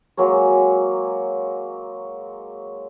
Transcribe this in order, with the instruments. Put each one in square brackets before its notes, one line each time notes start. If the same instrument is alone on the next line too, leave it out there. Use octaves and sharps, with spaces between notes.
[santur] F#3 G#3 A#3 C#5